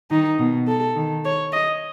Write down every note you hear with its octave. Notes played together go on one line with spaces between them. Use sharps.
D#3 D#4
B2
A4
D#3
C#5
D#5